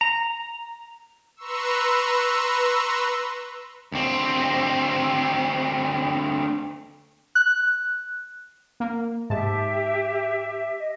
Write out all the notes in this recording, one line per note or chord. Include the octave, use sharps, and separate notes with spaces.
A#5
B4 A#5 C6 C#6 E6
D2 C4
F#6
A#3
G#2 G4 E5 A5
D#5